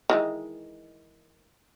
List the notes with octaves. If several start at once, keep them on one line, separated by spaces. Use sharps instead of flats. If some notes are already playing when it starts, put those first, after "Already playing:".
D#3 E3 G#3